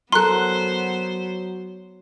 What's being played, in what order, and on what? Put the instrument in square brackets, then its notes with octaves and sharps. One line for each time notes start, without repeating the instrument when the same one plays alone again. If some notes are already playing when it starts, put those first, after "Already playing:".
[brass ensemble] F#3 [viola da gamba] B3 C5 [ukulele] A4 A#4 A#5 [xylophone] C6 F#6